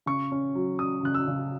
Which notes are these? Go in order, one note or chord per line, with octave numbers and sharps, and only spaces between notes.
C#3 C#6
C#4
F#3
C#4 D#6
C#3 F#6
E6
C#3